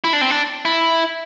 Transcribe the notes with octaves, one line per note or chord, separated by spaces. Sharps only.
E4
D4
C4
D4
E4